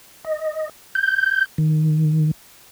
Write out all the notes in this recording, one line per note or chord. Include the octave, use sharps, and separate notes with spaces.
D#5
G6
D#3